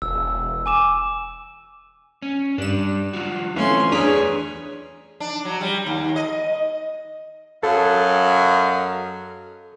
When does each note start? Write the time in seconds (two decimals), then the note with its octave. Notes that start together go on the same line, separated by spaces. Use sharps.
0.02 E1 E6
0.66 G#5 D6 E7
2.22 C#4
2.58 G2 G3 D4 E7
3.13 F#3 F4 F#4
3.56 F#2 E3 A3 C4 C#4 F4 C6
3.92 E2 D4 G#4 B4 C#5 A#5 D#6 B6
5.20 D4
5.45 F#3
5.61 G3
5.86 D#2
6.16 D#5
7.63 F#2 A4 D#5 F5